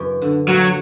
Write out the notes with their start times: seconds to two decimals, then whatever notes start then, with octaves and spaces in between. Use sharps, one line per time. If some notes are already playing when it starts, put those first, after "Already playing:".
Already playing: F#2 C#3 E3
0.22 D3
0.48 A#2 F#3